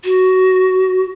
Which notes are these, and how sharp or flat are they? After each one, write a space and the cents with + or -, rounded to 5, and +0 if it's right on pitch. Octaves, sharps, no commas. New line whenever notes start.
F#4 +15